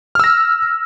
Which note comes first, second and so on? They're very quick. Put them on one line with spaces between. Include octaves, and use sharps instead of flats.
F6 E6 A#6